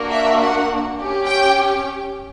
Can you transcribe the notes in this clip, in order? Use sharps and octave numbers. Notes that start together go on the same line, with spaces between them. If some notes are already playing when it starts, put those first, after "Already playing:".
Already playing: A#3 D4 F#4
E5
F#5
C#4 G4
G5